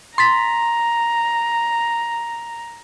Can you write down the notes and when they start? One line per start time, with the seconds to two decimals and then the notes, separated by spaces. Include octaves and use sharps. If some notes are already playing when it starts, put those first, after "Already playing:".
0.18 A#5 C6 A6 B6